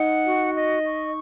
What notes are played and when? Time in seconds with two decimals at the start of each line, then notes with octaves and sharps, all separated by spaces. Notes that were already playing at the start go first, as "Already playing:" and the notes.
Already playing: D#4 F#5
0.24 F#4
0.54 D#5
0.85 C#6